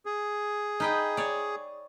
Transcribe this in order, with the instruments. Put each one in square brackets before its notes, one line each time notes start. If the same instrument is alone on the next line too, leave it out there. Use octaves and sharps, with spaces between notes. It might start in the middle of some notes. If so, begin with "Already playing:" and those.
[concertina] G#4
[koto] D#4 B4 G5
C#5 D5